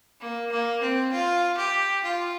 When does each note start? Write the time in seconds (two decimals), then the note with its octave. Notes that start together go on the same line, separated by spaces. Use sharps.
0.20 A#3
0.51 A#3
0.81 C4
1.12 F4
1.57 G4
2.03 F4